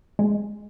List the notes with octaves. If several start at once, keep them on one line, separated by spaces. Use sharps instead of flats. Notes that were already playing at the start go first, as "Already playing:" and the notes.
G#3